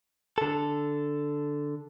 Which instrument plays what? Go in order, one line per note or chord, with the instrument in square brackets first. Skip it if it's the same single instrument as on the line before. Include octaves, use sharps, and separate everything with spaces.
[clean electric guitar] D3 A4